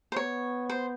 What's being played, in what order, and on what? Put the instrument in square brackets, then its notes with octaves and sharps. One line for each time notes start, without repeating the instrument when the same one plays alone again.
[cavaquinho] C5
[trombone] B3 [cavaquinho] C#5
[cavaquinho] C5